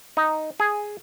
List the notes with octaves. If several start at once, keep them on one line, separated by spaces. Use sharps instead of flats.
D#4
G#4